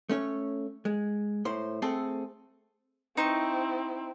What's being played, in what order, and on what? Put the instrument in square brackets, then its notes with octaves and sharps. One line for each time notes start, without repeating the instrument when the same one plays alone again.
[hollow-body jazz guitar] A3 C#4 C#5
G#3
A2 C5
A3 C4 G#4 A4
[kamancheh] C4 E4 [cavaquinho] D#4 C5 C#6